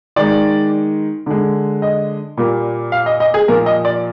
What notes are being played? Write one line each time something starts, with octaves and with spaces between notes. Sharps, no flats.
D#3 G#3 D5
D3 G#3
D#5
A#2 G3 A#3
F5
D#5
D#5
G#4
A#2 F3 A#3 A#4
D#5
D5